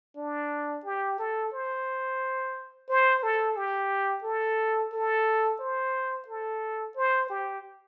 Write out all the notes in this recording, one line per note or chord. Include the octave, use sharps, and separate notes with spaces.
D4
G4
A4
C5
C5
A4
G4
A4
A4
C5
A4
C5
G4